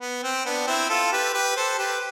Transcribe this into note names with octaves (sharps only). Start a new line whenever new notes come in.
B3
C4
B3 D4
C4 E4
F4 A4
G4 B4
G4 B4
A4 C5
G4 B4